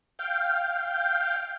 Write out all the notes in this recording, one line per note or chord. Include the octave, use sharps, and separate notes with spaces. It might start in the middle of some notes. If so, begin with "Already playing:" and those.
F5 G5